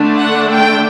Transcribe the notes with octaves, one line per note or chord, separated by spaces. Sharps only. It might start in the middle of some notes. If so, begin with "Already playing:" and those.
Already playing: D3 A3 D4
F#5
G5